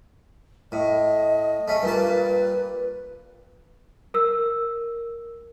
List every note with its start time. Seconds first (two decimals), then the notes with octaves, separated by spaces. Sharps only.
0.72 A2 D#5
1.68 A3 C#4
1.83 G2 A#2 B4 A5
4.14 A#4 E6